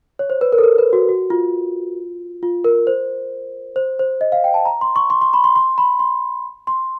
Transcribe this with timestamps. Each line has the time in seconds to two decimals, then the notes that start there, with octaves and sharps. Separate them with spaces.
0.19 C#5
0.30 C5
0.41 B4
0.53 A#4
0.58 A4
0.64 A#4
0.78 B4
0.93 F#4
1.09 F#4
1.30 F4
2.43 F4
2.64 A#4
2.87 C5
3.76 C5
3.99 C5
4.21 D#5
4.32 F5
4.44 G5
4.54 A5
4.65 A#5
4.81 C6
4.96 C#6
5.10 C6
5.21 C6
5.33 B5
5.44 C6
5.56 C6
5.78 B5
5.99 C6
6.67 C6